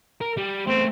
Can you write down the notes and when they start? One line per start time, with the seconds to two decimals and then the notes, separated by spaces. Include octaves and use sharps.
0.21 A#4
0.38 G3
0.67 A3 B3 C4